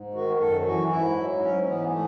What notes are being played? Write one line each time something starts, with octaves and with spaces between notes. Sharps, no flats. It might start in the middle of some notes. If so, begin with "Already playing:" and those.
Already playing: G#2
D#3 F#4
F#2 A4
E3 F#4
G#2 E4
F#3
G#2 C#4
E3 B3
A3